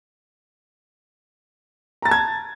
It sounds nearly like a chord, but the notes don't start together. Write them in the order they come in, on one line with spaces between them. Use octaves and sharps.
A#5 A6 A5 G#6